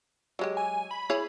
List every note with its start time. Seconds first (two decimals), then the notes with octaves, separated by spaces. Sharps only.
0.39 F#3 G#3 G4
0.57 G#5
0.91 B5
1.10 E4 G#4 C#5